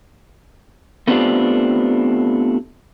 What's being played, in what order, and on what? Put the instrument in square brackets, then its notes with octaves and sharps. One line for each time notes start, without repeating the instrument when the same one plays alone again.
[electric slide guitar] A3 B3 C4 D4 F4 G4